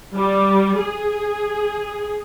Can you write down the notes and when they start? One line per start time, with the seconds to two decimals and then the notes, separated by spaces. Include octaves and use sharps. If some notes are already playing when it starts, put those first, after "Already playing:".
0.15 G3
0.78 G#4